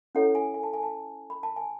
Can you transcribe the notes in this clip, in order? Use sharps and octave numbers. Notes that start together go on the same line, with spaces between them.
C#4 E4 A4 C#5 F#5
G#5
G#5
A5
G#5
A5
B5
A5
G#5